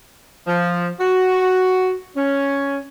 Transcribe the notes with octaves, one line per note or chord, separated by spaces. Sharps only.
F3
F#4
C#4